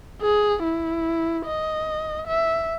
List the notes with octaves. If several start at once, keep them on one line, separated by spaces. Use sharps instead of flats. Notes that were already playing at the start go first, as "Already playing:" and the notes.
G#4
E4
D#5
E5